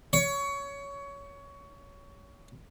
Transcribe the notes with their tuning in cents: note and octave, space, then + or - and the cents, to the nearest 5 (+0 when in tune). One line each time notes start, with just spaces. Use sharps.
C#5 +20